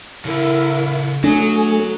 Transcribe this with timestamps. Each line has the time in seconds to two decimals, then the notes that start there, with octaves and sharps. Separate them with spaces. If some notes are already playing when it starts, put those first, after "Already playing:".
0.25 C#3 E4 A4 A#4
1.24 F#3 A3 D4 G#5 D#6